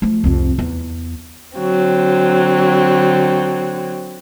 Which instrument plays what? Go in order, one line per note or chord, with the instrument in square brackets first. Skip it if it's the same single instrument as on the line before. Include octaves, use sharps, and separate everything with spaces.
[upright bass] F3 A3
C2 F2
E2
[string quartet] D3 F#3 C4